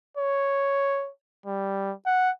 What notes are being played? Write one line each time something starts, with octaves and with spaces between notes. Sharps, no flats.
C#5
G3
F#5